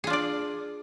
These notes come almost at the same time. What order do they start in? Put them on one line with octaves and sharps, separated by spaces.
G#4 F4 D4 D5